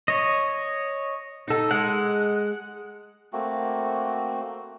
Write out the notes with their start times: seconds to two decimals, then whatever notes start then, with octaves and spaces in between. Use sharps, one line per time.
0.08 C#5 D#5
1.48 D#4 A4
1.71 G#3 F#5
3.33 A3 A#3 C4 F#4